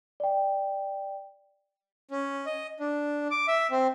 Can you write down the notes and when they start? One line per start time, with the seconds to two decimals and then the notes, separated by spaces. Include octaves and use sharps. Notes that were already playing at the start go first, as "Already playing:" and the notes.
0.20 D5 G5
2.11 C#4
2.46 D#5
2.80 D4
3.31 D6
3.48 E5
3.71 C4